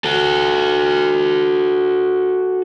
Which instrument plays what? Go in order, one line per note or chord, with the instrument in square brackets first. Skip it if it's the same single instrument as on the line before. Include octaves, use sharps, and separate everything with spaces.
[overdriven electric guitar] F#4 A4